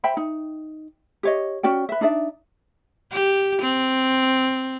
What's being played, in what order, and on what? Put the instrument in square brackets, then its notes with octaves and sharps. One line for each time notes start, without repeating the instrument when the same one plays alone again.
[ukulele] C5 E5 G5 B5
D#4
G4 C#5 D#5
C#4 F#4 D5 G5
B4 E5
D4 D#4 D5 E5
[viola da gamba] G4
C4